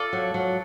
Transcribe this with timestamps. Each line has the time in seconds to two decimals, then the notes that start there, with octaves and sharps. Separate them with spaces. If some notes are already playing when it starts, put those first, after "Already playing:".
Already playing: F4 A4 D5
0.13 F#3
0.34 F#3